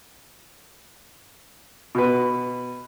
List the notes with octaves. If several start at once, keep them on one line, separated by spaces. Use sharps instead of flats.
B2 B4